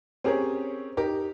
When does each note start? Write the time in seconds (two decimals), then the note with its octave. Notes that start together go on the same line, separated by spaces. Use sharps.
0.24 C4 C#4 G4 G#4 A#4 C#5
0.97 D#4 G4 A#4